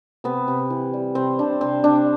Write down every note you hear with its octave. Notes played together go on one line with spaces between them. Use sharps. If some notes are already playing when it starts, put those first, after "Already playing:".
C3 B3
C3
E3
G3
C3 C4
C3 D4
C3 C4
C3 D4